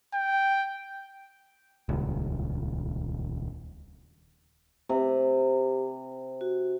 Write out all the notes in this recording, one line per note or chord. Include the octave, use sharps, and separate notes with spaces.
G5
D#1 C#2
C3 G4
F#4